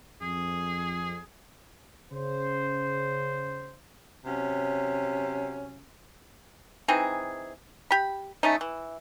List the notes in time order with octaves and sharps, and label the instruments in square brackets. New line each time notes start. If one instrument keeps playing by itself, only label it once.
[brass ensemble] F2 [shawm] G#4
[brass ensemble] C#3 C5
[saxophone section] C3 F#3 C#4
[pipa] E3 C4 D#4 G#4
G4 B5
A3 C#4 D#4
E3